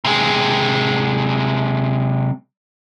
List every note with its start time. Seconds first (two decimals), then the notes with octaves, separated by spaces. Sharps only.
0.05 C3 G#3